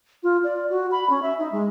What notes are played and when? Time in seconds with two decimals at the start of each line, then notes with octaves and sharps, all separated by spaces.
0.23 F4
0.44 D5
0.70 F#4
0.92 B5
1.10 C#4
1.22 E5
1.39 D#4
1.52 G#3